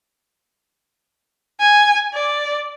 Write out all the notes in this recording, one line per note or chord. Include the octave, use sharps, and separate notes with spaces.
G#5
D5